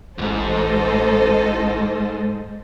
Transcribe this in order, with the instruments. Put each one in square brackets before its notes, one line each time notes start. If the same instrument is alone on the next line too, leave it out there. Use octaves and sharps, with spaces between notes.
[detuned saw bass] A1 [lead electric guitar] D2 G#2 [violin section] A4 C5 D#5